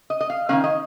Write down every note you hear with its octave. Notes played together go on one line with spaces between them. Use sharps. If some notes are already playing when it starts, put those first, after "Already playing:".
D#5
D#5
F5
D#3 A#3 C#4 F5
D#5